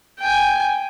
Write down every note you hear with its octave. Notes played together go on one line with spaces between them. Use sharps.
G5 G#5